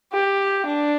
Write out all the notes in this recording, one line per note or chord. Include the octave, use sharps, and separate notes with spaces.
G4
D4